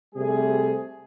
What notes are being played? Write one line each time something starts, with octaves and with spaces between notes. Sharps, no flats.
C3 G3 A3 G#4